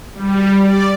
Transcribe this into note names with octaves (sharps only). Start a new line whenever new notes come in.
G3
D5